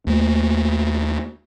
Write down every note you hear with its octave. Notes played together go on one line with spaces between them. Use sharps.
D#2 A3